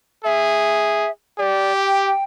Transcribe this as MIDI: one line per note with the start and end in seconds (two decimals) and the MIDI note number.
0.25 1.09 68
0.25 1.11 76
1.39 2.12 67
1.39 1.75 74
1.76 2.24 79